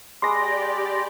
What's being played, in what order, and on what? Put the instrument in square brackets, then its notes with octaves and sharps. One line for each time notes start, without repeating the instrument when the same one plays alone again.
[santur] G#3 B4 D6 [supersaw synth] G4 D5 [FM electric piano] C6 A#6